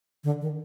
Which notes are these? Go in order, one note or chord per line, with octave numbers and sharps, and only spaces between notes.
D3
D#3